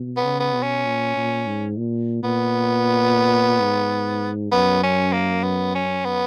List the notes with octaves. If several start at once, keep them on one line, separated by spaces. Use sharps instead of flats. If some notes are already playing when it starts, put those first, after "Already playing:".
Already playing: B2
B3
C#3
B3
B2
C#4
A#2
A#2
G#2
A#2
A#2 B3
G#2
F#2 B3
C#4
A#3
B3
C#4
B3